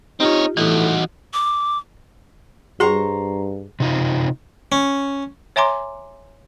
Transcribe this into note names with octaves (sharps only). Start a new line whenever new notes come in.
C4 D#4 F4 G4 C#5
A2 E3 D#4 F#4
D6
G2 G3 F#4 G#4 C5 A#5 C#6
C3 D#4 F4
C#4
C#5 E5 G#5 A#5 C6 D6